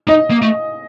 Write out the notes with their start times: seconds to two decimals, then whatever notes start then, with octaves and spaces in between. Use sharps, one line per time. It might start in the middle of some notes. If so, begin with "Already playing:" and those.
0.08 D#4 D#5
0.31 A#3
0.42 A3